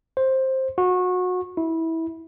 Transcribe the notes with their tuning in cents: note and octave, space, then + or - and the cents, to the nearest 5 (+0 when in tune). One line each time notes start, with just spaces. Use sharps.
C5 +10
F#4 -25
E4 -20